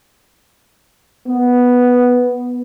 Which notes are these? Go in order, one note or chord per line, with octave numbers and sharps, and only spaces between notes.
B3